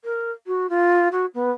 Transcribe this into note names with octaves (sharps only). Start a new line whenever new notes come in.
A#4
F#4
F4
F#4
B3